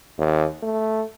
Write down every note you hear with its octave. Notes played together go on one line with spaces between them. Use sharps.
D#2
A3